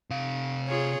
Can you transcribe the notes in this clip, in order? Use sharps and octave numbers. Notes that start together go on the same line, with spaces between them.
C3 F5
F4 G#4 C#5